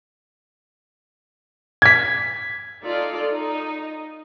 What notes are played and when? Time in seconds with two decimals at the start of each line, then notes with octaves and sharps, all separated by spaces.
1.82 G#6 B6
2.84 D#4 F4 A4 D5
3.29 D#4